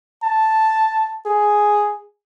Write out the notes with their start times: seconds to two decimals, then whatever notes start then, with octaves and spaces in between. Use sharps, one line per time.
0.23 A5
1.26 G#4